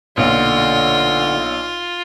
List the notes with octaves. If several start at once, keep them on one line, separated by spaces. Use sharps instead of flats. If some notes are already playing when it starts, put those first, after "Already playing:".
B1 A#2 D3 F4